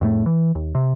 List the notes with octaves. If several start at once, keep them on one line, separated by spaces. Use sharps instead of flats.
F2 A2 A3
E3
D#2
C3